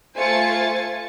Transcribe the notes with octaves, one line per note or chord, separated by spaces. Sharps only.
A3 F4 C5 G#5 A6 C#7